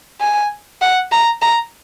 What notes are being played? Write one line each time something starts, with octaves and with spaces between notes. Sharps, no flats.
G#5
F#5
A#5
A#5